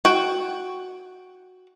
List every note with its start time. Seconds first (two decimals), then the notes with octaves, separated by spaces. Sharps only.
0.05 F#4 G5